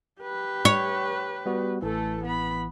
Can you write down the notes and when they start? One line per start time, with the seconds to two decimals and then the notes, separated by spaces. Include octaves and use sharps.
0.21 G4 B4
0.65 C#5
1.46 G3 B3 F#4
1.82 A1 E3 A3 A4
2.24 B3 B5